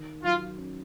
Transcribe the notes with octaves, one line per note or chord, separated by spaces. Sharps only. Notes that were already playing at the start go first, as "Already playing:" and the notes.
Already playing: D#3
F#3 F4
C#4